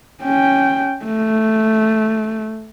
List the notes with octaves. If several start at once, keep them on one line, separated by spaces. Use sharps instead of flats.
C#4 G5
A3